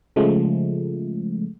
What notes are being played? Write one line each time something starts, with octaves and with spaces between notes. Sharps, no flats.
C#3 F3 G#3 A3